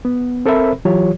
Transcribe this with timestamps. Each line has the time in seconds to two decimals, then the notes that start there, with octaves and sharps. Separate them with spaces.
0.05 B3
0.46 C4 A4 A#4 C5 E5 B5
0.85 E3 F#3 F4 G4 C#5